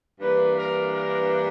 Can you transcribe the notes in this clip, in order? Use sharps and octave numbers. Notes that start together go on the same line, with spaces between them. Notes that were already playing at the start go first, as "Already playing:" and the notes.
G2 E3 A#3 D4 B4
A#4
A#4